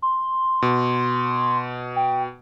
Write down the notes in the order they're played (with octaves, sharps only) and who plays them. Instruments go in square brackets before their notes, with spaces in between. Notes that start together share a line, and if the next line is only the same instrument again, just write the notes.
[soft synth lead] C6
[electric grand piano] B2
[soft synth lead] G5